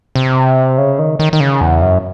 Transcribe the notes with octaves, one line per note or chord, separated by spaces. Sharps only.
C3
C#3
D#3
D#3
D#3
C#3
E2
F#2